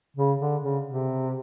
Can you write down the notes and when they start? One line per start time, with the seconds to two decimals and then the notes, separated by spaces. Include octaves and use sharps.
0.17 C#3
0.40 D3
0.62 C#3
0.85 C3